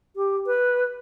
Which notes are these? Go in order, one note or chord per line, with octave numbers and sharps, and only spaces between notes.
G4
B4